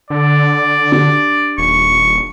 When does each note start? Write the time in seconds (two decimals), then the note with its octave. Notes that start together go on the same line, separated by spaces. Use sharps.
0.10 D3 D5
0.92 D4 G4
1.58 D#1 C#6